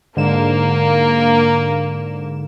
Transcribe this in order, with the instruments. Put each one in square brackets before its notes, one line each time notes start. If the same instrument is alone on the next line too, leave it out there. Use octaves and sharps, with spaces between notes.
[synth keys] G#2 D3 E7 [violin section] A#3